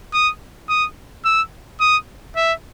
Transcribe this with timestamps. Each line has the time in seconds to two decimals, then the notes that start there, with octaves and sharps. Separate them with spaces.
0.13 D#6
0.69 D#6
1.25 E6
1.80 D#6
2.36 E5